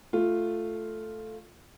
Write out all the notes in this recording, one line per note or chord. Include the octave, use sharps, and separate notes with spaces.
A3 F4